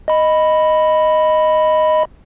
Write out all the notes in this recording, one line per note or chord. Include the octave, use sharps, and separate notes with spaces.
D#5 B5